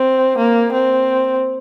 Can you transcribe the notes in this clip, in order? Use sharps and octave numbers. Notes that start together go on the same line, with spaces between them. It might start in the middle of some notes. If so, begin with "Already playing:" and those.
Already playing: C4
A#3
C4